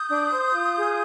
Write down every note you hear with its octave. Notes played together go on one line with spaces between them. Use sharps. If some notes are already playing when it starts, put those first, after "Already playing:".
Already playing: D#6 G6
D4
C5
F4
G#4